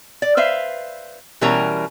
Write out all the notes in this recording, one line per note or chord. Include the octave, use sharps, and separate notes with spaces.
D5
B4 C5 E5 F5
B2 E3 G3 C#4 A#4 A#5